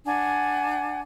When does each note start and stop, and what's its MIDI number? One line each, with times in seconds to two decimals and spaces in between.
0.06 1.01 62
0.06 1.01 78
0.06 1.01 80